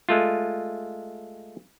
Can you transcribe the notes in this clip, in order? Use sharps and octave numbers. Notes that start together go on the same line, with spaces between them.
G#3 A3 F4